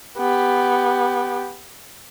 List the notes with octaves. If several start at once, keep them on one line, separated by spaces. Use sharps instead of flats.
B3 G4